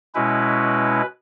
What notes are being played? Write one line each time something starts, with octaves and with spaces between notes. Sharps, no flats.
B2 G#3 C#4 E4 B4